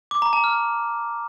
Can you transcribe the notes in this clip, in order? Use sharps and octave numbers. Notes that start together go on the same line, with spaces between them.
D6
A#5
A5
F6